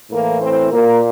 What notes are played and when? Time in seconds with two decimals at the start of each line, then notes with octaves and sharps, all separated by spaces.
0.10 A2 E3 A#3 A#4
0.41 C4 C5
0.71 A#2 A#3 A#4